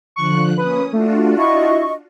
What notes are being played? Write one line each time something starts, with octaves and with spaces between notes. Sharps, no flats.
D3 F3 C#6 F#6
A#3 C#4 B4 D#6
A3 D4 F4 F#4
E4 D#5 C#6